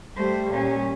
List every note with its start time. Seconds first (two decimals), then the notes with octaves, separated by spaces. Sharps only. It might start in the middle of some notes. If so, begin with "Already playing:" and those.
0.16 G3 A3 C5
0.51 A#2 C#4